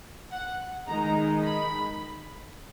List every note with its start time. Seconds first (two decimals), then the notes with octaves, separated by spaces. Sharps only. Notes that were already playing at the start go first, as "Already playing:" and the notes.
0.32 F#5
0.87 D#3 G#3 D#4 A#5
1.42 B5